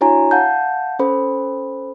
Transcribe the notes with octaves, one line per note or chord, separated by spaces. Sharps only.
D4 E4 F#4 C#5 G#5 A#5
F5 F#5 A5 G6
C#4 A4 C5 B5